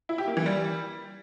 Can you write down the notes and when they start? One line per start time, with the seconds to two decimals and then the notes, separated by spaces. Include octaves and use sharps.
0.09 E4
0.18 G4
0.27 A#3
0.37 E3
0.46 G3